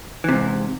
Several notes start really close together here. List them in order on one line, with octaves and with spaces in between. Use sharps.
E3 C3 G#2